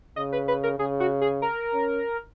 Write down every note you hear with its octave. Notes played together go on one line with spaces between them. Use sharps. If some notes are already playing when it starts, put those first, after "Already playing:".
C#3 D#5
B4
B4
A#4
C#3 G#4
F#4
G#4
A#4
C#4